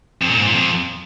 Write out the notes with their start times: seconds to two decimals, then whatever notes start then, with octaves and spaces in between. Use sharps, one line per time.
0.22 F2
0.29 A#2
0.37 G#2
0.45 A#2
0.53 F2